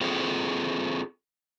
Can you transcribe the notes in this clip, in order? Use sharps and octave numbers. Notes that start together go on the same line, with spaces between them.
C4 F4 G#4 A4